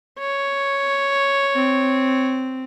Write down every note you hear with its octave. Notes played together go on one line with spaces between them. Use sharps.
C#5
C4